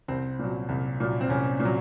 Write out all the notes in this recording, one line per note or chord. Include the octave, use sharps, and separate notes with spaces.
C2 C4
A#2 F#3
C2
A#2 F#3
C4
C2 C#4
A#2
F#3